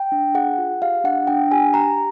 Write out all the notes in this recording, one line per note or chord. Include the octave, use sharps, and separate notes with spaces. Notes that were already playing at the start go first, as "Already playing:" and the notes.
Already playing: G5
D4
G#4 F#5
F4
G4 F5
D4 F#5
D4 G5
G4 G#5
G4 A#5